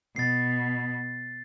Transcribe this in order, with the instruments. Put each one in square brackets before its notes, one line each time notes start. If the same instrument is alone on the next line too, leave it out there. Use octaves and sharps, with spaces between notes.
[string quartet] B2 [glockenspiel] A6 C7